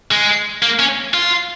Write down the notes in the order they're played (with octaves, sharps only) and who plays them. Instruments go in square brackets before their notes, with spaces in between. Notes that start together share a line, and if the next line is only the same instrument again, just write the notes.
[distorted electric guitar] G#3
A#3
C#4
F4